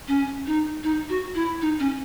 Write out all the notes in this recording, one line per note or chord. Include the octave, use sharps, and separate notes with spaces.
C#4
D#4
D#4
F#4
E4
D#4
C#4